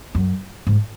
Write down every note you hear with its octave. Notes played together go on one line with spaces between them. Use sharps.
F#2
G#2